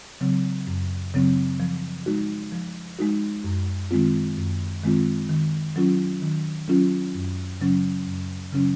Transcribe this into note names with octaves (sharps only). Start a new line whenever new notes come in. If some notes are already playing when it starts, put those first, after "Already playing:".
C#3 F#3 C4
F#2
C#3 F#3 C4
F3
G#3 D#4 F#4
F3
G#3 D#4 F#4
F#2
D#3 G#3 C4 F4
F#2
D#3 G#3 C4 F4
D#3
F#3 C#4 F4
D#3
F#3 C#4 F4
F#2
C#3 F#3 C#4
F#2
C#3 F#3 C#4